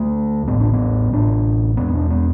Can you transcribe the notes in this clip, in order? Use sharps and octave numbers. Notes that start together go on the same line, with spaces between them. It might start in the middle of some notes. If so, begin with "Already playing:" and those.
Already playing: D2 D3 A3
A1 A2 B3
D4
B3
A1 A2 D4
E1 E2 B2 B3
D4
B3